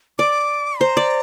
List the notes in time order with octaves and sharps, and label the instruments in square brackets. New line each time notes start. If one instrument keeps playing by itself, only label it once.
[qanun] D5 [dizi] D6
[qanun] C5 [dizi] A#5
[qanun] D5